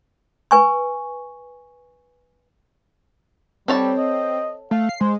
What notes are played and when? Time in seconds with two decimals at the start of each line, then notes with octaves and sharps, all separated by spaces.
0.51 B4 G#5 C#6
3.68 G3 C4 A4 C#5 A5
3.97 D#5
4.71 A3 F5
4.89 C7
5.01 G#3 C5